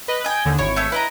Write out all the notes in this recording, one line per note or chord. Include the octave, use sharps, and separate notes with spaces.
B4 D#5
D#5 G5 G#5 G6
D#2 D3
G#1 E4 C#5
A3 G#4 E5
E4 B4 D#5 A#5